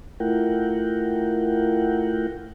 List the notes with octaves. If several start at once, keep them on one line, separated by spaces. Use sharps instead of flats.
A3 E4 F4 A#4 F#5 G5